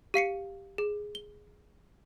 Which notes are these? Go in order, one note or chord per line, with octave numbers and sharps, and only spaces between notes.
G4 F5 C7 C#7
G#4
G7